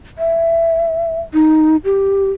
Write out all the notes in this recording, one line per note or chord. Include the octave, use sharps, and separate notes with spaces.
E5
D#4
G4